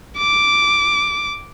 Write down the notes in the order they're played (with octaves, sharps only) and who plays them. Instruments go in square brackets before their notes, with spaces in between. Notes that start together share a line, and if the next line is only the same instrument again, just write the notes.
[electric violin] D6